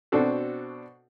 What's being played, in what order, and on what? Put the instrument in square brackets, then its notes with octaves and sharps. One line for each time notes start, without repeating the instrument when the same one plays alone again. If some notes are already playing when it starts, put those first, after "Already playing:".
[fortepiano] B2 C4 D4 F#4 A4